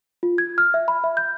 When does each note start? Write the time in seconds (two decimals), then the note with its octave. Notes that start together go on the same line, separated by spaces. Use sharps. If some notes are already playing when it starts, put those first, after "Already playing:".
0.23 F4
0.38 G#6
0.58 F6
0.74 E5
0.88 B5
1.04 E5
1.17 G6